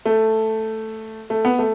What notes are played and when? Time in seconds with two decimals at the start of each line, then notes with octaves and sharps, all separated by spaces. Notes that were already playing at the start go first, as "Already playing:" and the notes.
0.06 A3
1.30 A3
1.45 B3
1.59 A3